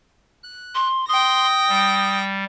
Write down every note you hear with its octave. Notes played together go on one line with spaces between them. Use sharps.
F#6
C6
G5 C6 D#6 A#6
G3